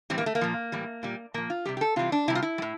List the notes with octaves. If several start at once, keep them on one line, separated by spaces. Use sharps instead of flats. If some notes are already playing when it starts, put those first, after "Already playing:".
A2 E3 G3 C4
A#3
A3
A#3
A#2 F3
A2 E3 G3
A#2 G3
A#2 F3 A#3
F4
C3 E3 G3 G4
G4
A4
C3 E3 G3 F4
D4
C3 G3 E4
F4
E4
G3
A2